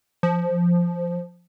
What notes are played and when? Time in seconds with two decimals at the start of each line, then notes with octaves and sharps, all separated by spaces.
0.23 F3